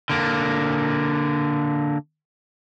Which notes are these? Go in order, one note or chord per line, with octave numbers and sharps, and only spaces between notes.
D3 A#3